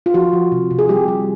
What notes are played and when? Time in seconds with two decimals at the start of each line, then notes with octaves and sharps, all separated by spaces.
0.06 F4
0.14 F3 F#4
0.33 F3
0.52 C3
0.71 C3
0.79 G#4
0.89 G3 G4
1.08 G3